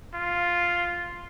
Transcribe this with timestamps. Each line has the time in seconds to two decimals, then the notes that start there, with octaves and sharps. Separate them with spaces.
0.15 F4